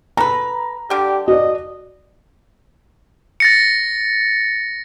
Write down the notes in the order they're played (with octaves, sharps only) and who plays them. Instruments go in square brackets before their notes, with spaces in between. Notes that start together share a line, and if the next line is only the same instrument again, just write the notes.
[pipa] A4 B4 [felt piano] A#5
[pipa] D3 G3 [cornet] G4
[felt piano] F#4 D5 [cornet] D#5
[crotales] A6 A#6 C#7